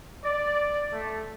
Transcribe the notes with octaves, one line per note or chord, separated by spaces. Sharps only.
D5
A3